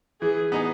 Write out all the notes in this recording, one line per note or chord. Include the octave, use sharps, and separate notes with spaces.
E3 G#4
B3 D#4 G#4